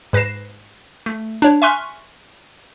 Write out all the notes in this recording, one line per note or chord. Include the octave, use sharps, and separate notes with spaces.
G#2 B4 A#6 C7 E7
A3
D4 C#5
E5 G#5 C6 C#6 F6 F#6